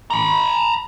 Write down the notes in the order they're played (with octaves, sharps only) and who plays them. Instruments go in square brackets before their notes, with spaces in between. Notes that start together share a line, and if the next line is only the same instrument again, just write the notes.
[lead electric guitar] A#5 B5